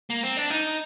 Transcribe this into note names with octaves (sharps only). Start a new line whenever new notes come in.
A#3
C4
D4
D#4